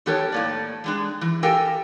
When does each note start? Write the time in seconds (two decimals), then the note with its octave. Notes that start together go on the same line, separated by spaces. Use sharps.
0.06 D#3 B3 G4 A4 A#4 C#5
0.32 A2 A#3 D5
0.84 G3 G#3 D4
1.21 E3
1.43 G4 A4 A#4 F5 G5 G#5